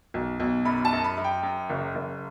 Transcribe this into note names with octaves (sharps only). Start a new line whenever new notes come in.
B1
B1
F#2 B5
A5
F#2
B5
F#2
G5
F#2
F#1
F#1